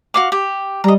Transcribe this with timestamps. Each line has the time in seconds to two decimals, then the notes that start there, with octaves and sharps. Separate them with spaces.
0.14 F#4 F5 D6
0.32 G4
0.84 G3 D#5 A#5